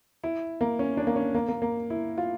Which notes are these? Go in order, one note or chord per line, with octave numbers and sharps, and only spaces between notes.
E4
A#3
C#4
D4
A#3
C#4
A#3
A#3
A#3
E4
F4